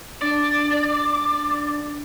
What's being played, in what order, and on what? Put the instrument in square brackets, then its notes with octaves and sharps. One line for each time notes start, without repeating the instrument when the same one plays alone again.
[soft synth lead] D4 [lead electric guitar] D5